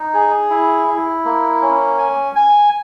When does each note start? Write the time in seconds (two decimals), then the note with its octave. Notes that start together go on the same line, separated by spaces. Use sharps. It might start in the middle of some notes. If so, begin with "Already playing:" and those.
Already playing: D#4
0.14 G#4
0.50 E4
0.88 E4
1.25 A#3
1.61 C#4
1.98 G#5
2.35 G#5